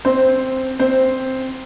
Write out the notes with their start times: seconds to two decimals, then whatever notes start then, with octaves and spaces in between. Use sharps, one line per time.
0.05 C4 C5
0.79 C4 C5